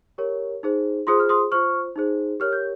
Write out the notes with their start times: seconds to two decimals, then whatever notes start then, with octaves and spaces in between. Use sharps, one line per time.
0.18 G4 A#4 C#5
0.63 D#4 G#4 C5
1.07 F4 G#4 C5 C6 D#6
1.20 F6
1.29 C6 D#6
1.52 F4 C5 C#6 F6
1.96 D#4 G#4 C5
2.40 G4 A#4 C#5 F6
2.53 G6